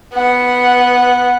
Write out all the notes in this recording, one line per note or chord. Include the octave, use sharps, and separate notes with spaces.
B3 F#5